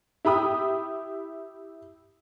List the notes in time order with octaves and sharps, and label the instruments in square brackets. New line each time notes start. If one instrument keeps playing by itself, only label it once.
[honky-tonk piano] E4 G4 B5 D#6